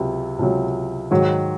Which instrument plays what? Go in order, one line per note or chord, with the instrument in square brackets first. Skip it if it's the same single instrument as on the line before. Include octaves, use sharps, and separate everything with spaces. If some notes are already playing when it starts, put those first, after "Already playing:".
Already playing: [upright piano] C#2 C3 F#3
C#2 C3 F#3
G#2 D#3 F#3